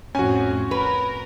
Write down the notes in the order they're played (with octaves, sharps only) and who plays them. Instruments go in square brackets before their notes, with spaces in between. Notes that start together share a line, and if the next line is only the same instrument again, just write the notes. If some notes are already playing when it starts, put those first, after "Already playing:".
[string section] F2 A2 C4 [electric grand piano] C#4 F#4 [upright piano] G#5
[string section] A#4 [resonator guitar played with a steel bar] B4